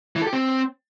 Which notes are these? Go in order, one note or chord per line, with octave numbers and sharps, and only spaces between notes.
E3
A4
G4
C4